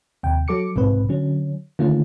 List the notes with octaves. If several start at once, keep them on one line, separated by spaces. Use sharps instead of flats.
D#2 C3 G5
F#3 A4 D6 C#7
B1 G#2 C3 C4 B4
D3 F#3 C#4
D3 D#3 A3 A#3 C#4 F4